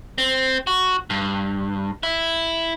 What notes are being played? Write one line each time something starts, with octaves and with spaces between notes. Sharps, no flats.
C4
F#4
G2
E4